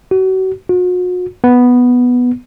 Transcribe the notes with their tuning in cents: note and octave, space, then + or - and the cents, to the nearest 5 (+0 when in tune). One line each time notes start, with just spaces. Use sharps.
F#4 +35
F#4 -40
B3 +0